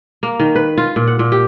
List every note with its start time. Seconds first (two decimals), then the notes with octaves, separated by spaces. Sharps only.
0.23 A#3
0.40 D#3
0.55 B4
0.78 F4
0.96 A#2
1.07 F#5
1.19 A#2
1.32 G4